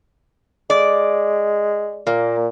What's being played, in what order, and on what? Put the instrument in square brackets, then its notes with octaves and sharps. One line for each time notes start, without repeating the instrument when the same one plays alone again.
[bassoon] G#3 [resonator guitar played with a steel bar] D5
[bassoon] A#2 [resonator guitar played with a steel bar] A#3